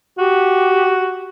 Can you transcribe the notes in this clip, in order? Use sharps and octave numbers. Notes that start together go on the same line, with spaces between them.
F#4 G4